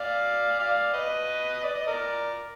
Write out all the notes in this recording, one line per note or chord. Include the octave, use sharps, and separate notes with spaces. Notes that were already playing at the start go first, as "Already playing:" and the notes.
Already playing: D5 F5
D5 F5
B4 D#5
D5
D#5
A#4 D5